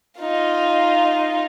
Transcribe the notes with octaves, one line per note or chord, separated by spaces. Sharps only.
D#4 F4